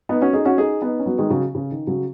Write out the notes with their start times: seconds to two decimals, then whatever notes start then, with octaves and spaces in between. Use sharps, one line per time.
0.09 B3 D#4
0.21 C#4 F#4
0.33 D#4 G#4
0.45 C#4 F#4
0.58 D#4 G#4
0.82 B3 D#4
0.99 C#4
1.06 F#3 B3
1.18 D#3 G#3
1.30 C#3 F#3
1.55 C#3
1.71 D#3
1.87 C#3 F#3